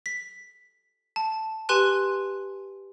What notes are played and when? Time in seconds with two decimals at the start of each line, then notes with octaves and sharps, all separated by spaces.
0.06 B6
1.16 A5
1.69 G4 B4 G#5 C6 F#6 D#7